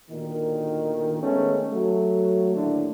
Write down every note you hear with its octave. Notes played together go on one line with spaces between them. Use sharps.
D2 A#2 D#3
D#3 G#3 A3 B3 C#4
F#3 A3
D#2 A2 D3 A3 D4